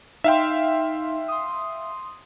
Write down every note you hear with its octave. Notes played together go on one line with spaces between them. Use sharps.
D#4 E5 F5 G5 C6
C6 D#6